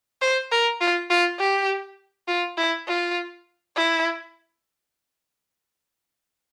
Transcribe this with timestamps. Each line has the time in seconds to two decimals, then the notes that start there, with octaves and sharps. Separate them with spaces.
0.22 C5
0.52 A#4
0.81 F4
1.10 F4
1.40 G4
2.28 F4
2.58 E4
2.88 F4
3.76 E4